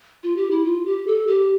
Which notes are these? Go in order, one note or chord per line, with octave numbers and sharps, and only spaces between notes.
F4
G4
E4
F4
G4
A4
G4